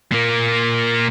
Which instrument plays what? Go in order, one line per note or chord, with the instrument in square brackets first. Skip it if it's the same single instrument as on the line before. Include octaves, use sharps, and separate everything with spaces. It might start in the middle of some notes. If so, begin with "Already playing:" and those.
[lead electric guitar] A#2 A#3